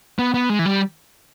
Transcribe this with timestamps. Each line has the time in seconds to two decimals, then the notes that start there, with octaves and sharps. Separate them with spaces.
0.19 B3
0.34 B3
0.50 G#3
0.59 E3
0.66 G3